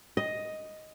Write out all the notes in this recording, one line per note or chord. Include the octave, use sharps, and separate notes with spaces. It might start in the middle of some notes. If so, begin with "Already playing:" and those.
D#5